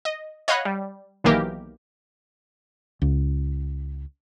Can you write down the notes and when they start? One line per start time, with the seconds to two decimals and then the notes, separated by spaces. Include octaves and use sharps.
0.05 D#5
0.48 C#5 D#5 F5 F#5 B5 F#6
0.65 G3
1.24 B1 D#3 E3 A#3 G4 A#4
3.02 C#2